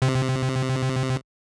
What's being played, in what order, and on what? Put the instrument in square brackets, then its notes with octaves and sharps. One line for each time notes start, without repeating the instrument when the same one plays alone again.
[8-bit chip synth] C3